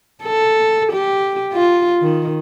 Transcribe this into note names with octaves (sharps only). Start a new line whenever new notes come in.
A4
G4
F4
D#3